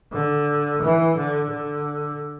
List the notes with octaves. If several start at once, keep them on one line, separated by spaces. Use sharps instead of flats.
D3
E3
D3
D3